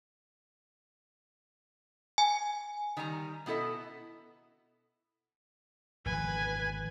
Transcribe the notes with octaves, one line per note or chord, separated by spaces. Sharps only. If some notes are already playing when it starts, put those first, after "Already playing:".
G#5
D#3 G3 G#5 A#5
B2 B3 E4 A4 D#5
G#1 D3 F3 B4 G#5